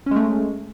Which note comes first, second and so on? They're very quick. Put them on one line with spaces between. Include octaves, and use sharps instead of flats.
C#4 G#3 A3